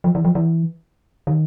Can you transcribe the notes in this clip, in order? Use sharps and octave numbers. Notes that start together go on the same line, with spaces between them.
F3
E3
F3
E3
D#3